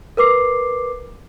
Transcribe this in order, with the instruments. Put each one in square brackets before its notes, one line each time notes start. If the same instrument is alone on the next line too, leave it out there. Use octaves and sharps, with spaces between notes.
[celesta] A#4 B4 D6 C7